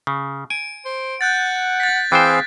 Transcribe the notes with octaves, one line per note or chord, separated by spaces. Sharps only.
C#3
G#5 D7
C5
F#5 F#6 G6 A6
A6 B6
E3 C4 G#4 C5 F5 G5